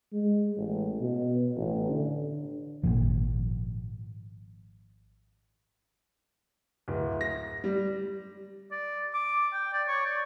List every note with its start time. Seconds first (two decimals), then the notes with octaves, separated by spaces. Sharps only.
0.13 G#3
0.57 A1
1.01 B2
1.56 A1
1.89 D3
2.83 G#1 C#2 A#2 F3
6.88 D1
7.21 A#6
7.64 G3
8.71 D5
9.14 D6
9.53 G5
9.73 D5
9.88 C#5
10.06 D5